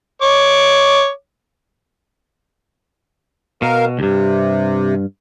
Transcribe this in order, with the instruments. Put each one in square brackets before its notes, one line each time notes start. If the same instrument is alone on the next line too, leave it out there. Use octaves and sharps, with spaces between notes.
[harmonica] C#5 D6
[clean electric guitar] B2 [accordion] A#4 F5
[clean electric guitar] D2 G2 [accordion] C3